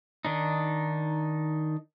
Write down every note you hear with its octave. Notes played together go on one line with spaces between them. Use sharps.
D#3 D4 D#4